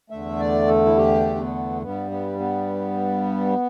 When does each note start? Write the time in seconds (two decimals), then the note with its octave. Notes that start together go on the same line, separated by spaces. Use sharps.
0.10 E2 D3 A3 E5
0.39 D5
0.68 A4
0.85 E4
0.97 G4
1.35 D4
1.39 B3
1.82 G2 G3 B3
2.11 B3
2.40 B3